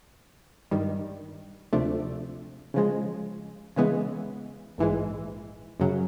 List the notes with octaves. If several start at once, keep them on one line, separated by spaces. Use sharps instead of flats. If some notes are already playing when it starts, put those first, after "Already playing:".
G2 D#3 G3
D2 C3 F3 A3 D4
C#3 F3 G#3
C#3 E3 G#3 B3
A#1 G#2 E3 G#3
F#2 C#3 F#3